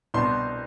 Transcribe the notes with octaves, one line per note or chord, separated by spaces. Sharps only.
C2 B2 B3 D4 C6